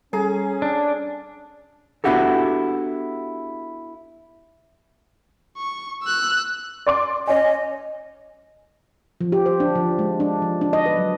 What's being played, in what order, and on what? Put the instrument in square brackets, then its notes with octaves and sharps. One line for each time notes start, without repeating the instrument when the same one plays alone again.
[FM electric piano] G3 A4 A#5 [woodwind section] C#4 [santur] G#4
[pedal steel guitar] D4
[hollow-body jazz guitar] B3 D4 E4 F#4 G4 A4
[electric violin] C#6
E6 F#6
[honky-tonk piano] D5 C6 D6
[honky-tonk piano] C#4 G#5 [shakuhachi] D#5
[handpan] F3
G4
C5
D4
F3
G#3
D4
F3
D4
D#5
B4
F#3